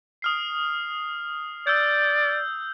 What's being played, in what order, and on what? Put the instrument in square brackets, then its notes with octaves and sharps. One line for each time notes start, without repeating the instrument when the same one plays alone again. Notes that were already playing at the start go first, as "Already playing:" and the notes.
[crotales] D#6 F6 C7
[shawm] D5 [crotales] E6 G6